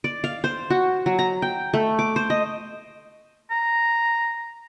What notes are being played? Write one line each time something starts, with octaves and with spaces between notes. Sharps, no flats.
D5
F5
C5
F#4
F#3
A#5
G5
A3
D6
C5
D#5
A#5